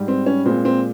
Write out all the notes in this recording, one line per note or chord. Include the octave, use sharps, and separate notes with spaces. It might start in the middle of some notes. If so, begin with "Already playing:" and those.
Already playing: G#2 G3
C4
C#4
A#2 G#3 C4
C4